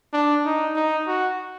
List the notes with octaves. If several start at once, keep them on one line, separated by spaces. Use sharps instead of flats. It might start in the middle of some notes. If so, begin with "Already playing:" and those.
D4
D#4
D#4
F#4